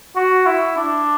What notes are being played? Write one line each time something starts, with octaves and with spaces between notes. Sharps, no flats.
F#4
E4
D4